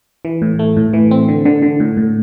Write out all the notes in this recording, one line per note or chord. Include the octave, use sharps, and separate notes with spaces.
E3
A2
A3
A2
E3
C4
D3
D3
D3
A2
A2